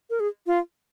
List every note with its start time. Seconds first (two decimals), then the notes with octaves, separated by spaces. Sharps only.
0.10 A#4
0.20 G#4
0.47 F4